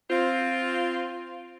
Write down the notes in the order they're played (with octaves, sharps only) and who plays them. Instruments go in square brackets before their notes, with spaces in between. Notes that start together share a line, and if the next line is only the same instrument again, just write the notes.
[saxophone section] C4 F4